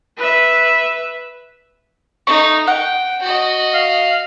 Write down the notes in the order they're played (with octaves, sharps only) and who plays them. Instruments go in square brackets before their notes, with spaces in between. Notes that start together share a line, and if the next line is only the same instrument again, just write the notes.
[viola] B4 E5
[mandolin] A3 C#6 [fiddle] D#4
[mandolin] F#5 [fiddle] G5
[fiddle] F#4 D#5
[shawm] F5